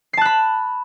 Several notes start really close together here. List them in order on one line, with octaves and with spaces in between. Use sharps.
C7 A5 F#6 B5